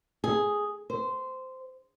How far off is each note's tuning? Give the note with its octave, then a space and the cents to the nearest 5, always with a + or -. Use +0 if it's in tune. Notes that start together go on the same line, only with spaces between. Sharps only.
G#4 +0
C5 -15